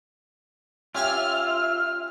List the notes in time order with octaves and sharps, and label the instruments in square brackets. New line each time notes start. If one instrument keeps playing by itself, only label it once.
[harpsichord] C#4 G4 G#5 [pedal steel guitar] F4 [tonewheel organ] E5 [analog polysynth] F6